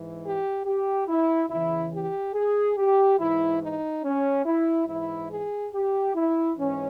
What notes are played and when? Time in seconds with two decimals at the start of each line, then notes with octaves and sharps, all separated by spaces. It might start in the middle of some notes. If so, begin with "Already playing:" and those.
Already playing: G#2 E3
0.23 G4
0.65 G4
1.07 E4
1.49 E2 C#3 E3 E4
1.92 G4
2.34 G#4
2.77 G4
3.19 G#2 E3 E4
3.60 D#4
4.03 C#4
4.45 E4
4.87 G#2 E3 E4
5.30 G#4
5.73 G4
6.14 E4
6.57 G#2 E3 C#4